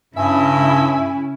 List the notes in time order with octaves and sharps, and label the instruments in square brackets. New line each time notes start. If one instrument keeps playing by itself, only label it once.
[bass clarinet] G2 [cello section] C#3 C#4 E4 [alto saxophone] E5 [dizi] G#5